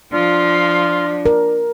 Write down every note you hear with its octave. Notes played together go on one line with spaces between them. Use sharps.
F3 D4 F4
A#4